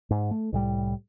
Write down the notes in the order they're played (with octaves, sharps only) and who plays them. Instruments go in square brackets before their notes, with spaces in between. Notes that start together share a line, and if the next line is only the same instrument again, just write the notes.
[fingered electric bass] G#2
A3
C2 A2 G3